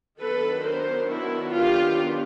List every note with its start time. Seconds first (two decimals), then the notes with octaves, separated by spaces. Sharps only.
0.21 D#3 F#3 B3 D4 A4 B4
0.65 A#4 C5
1.10 E4 F#4
1.55 F4 G4